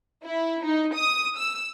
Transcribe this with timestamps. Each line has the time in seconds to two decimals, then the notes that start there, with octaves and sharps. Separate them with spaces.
0.24 E4
0.65 D#4
0.94 D#6
1.37 E6